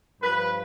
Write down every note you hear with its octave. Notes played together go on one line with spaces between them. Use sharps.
G2 F3 B4